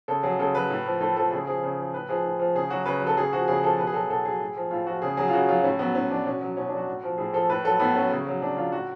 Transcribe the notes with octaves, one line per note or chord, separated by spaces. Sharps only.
C#3 A4
F#3 G#4
C#3 A4
F#3 B4
A2
F3
A2 A4
F3 A4
C#3 G#4
F3 G#4
C#3
F3
A2 B4
F3 G#4
A2
F3
C#3 G#4
F#3 F#4
C#3 B4
F#3
A4
C#3 G#4
F3 F#4
C#3 G#4
F3 A4
B2 B4
G#4
F#3 A4
B2 A4
F#3 G#4
A2
F3
A2 F4
F3 F#4
C#3 G#4
F#3 G#4
F4
C#3 F#4
F#3 F4
A2 C#4
F#3 B3
A2 C#4
F#3 D4
B2 C#4
F#3
B2 C#4
F#3 D4
F#4
A2
F3
A2 G#4
F3 A4
A2 B4
F#3 A4
A2 B3
F#3 C#4
C#3
F#3
C#3 D4
F#3 F4
A2 F#4